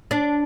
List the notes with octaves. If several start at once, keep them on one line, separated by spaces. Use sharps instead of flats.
D4